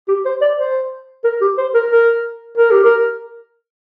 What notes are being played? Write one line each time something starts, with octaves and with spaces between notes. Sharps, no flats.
G4
C5
D5
C5
A#4
G4
C5
A#4
A#4
A#4
G4
A#4